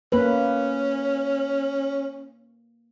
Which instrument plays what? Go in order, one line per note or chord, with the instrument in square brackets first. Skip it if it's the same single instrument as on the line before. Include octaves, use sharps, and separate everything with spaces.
[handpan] A#3 B4 [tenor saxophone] C#4